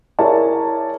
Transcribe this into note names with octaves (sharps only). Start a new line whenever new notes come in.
E4 G#4 A#4 C#5 D5 A5